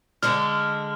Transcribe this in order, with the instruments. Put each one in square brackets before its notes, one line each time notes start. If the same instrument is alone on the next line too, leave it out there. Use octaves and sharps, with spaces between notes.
[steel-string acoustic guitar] D3 G#3 D4 A4 [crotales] F6